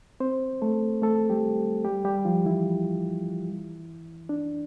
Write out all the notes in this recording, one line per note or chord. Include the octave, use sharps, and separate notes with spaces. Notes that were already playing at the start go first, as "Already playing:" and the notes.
C4 C5
A3 A4
A3 A4
G3 G4
G3 G4
G3 G4
F3 F4
E3 E4
D4